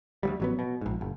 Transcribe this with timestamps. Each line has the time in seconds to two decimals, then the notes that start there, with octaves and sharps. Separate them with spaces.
0.23 D2 F#3 G3
0.40 A1 F#3 B3
0.59 B2
0.81 A#1 G#2
1.01 F#1